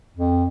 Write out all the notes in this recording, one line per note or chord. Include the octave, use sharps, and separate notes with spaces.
F2